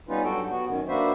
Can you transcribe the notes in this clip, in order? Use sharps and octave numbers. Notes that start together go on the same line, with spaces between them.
G3 B3 C#4 D#4 F4 B4
G2 F#3 F#4 A4 G5
B3 F#4
F#2 D#3
A#3 D4 F#4 B4 C5 E5